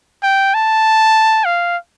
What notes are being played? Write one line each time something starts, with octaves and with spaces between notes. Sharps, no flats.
G5
A5
F5